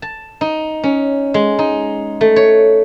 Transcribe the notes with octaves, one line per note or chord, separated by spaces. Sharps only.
A5
D#4
C#4
G#3
D#4
A3
C#5